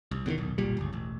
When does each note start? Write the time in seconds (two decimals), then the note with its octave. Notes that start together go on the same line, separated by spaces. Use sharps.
0.11 C2
0.26 E2 C3 D#3
0.38 D#1 B1
0.58 F#1 B1 A#2 G3
0.77 D1 G1 C#2
0.93 E1 A1